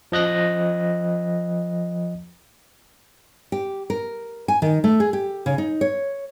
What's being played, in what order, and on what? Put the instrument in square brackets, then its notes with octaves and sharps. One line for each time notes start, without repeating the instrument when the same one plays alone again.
[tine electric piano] F3 D#5 F#6 A#6
[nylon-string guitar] G4
A#4
G#5
D#3
A3
G#4
G4
C#3
D#4
C#5